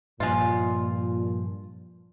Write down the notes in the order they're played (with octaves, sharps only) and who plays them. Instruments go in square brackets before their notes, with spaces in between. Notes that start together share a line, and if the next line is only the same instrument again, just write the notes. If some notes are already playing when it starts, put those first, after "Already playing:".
[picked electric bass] G2 F3 [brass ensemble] A#2 [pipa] G#3 F4